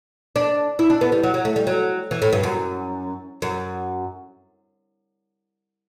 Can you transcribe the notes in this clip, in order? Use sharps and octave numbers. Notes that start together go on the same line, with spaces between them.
D4
E4
D4
B3
G3
F#3
F#3
A3
G3
F#3
E3
A2
G2
F#2
F#2